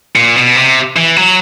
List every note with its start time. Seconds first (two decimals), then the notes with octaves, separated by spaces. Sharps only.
0.16 A#2
0.36 B2
0.56 C3
0.97 E3
1.16 F#3